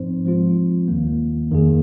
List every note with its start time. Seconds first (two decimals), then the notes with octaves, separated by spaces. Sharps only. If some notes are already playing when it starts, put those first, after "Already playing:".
Already playing: G#2 F3 C4 D#4 C5
0.25 F3 G#3 C4 F4
0.88 D#2 D#3 A#3
1.51 F2 D#3 A#3 G#4